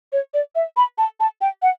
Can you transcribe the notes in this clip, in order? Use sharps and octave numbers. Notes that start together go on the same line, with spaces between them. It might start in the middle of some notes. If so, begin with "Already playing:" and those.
C#5
D5
E5
B5
A5
A5
G5
F#5